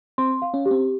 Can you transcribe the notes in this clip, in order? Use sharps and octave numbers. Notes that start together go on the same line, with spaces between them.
C4 C6
F5
C#4
G4
C4